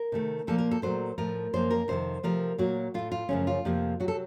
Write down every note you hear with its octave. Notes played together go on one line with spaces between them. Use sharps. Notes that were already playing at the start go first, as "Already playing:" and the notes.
Already playing: A#4
C3 D#3 A3
A#2 F3 A#3 A4
A#4
A4
A#2 F#3 A3 C5
A2 F3 A3 A#4
F#2 F3 A#3 C5
A#4
F2 C3 D#3 C5
C3 F3 A3 A#4
A#2 F#3 A#3 F#4
A2 A3 F4
F4
F#2 C#3 F3 A3 C#4
F4
F2 C3 F3 A#3
C3 F#3 F#4
A4